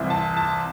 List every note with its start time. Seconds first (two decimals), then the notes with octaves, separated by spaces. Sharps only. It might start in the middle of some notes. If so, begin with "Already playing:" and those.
Already playing: C2 C3 E3
0.10 A5
0.37 A5